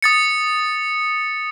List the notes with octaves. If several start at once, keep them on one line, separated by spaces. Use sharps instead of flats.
D#6 A6 C#7